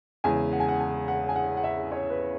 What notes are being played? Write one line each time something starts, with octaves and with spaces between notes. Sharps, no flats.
E2 C#3 G#3 G#5
F#5
G#5
F#5
G#5
F#5
G#5
F#5
F#5
E5
C#5
B4